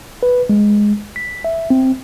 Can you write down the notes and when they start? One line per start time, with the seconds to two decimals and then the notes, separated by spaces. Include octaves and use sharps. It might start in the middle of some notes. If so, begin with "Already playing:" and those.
0.23 B4
0.49 G#3
1.16 B6
1.44 E5
1.70 C4